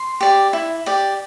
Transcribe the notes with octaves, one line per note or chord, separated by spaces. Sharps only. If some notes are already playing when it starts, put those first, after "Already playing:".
Already playing: C6
G4 D5
E4
G4 D5